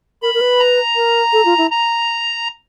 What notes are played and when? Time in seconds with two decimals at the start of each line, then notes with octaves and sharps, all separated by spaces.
0.22 A#4 B5
0.34 A#4
0.41 B4
0.59 A#5
0.96 A#4
1.33 A4
1.45 F4
1.58 E4
1.71 A#5